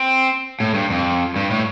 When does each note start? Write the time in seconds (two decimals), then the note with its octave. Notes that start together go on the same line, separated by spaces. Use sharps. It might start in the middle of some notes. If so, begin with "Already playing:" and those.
Already playing: C4
0.60 A2
0.74 G2
0.90 F2
1.36 G2
1.51 A2